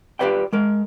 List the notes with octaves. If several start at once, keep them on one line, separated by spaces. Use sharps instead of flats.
F4 G4 A4 B4 D5 G5
G#3 A#4